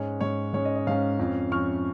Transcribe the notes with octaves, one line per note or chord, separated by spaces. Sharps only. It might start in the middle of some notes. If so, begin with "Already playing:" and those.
Already playing: G#2 G#3 C#4 C#5
G#2 G#3 C#4 C#5
G#2 G#3 C#4 C#5
D#5
D#5
G#2 G#3 C#4 C#5 F5
F2 F3 C#4
F2 F3 C#4 C#6 F6